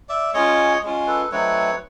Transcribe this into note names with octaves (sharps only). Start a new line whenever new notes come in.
D5 E5
G#3 C#4 F4 C#5 D#5
G#3 C#4 F4
A4 B4
F#3 A3 C4 D#4 B4 C#5